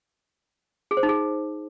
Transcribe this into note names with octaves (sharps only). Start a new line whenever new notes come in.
G#4
C5
D#4
G#4